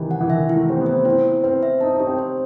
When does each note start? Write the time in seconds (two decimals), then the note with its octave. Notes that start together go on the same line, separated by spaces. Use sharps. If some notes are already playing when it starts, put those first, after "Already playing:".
Already playing: C3 D#3 E3
0.11 F#5
0.21 E3
0.30 D#3 E5
0.49 E4
0.55 A3
0.69 C4 G4
0.81 B3
0.86 C5
1.05 C4 E4
1.25 E4
1.44 C4 B4
1.63 E5
1.81 D#4 A5
1.96 D#4 G4
2.07 C4
2.19 C5